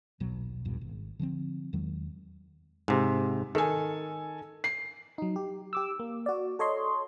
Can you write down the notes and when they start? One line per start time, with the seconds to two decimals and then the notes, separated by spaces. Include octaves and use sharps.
0.20 D#1 B1 B2 F#3
0.65 B1 E2 G2 A#2
0.81 G#1
1.19 D3 F3 G3 C4
1.73 E2 D#3 F#3 G#3
2.88 G#2 C3
3.55 D#3 A4 G#5
4.64 C7
5.18 F#3 D#4
5.36 G4
5.73 G4 D6 E6
6.00 A#3
6.26 F#4 D5
6.59 A4 C#5 D#5 C6